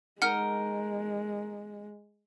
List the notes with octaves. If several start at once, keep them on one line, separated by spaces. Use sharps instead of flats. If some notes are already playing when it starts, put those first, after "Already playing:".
G#3 D#4 A#4 F#5 F6